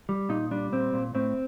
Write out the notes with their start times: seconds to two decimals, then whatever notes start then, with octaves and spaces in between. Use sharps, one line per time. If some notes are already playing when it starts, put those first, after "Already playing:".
0.09 G3
0.29 A#2 D#4
0.51 G3 D4
0.72 A#2 C4
0.93 A#2
1.15 A2 C4